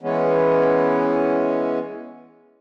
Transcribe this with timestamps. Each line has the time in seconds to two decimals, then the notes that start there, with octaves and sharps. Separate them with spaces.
0.01 E3 G#3 B3 C#4